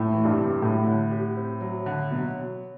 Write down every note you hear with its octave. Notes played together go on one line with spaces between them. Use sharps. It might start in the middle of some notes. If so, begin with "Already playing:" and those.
Already playing: A2 A3
E3
G2
C3
A2 F#3
D3
G4
C4
F#3
D3
B2 F#3